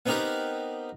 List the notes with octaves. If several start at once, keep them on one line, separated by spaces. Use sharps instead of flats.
B3 C4 D#4 G4 A#4 B4